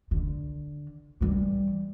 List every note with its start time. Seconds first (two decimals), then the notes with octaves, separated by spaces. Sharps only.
0.11 D3
1.21 E3 G3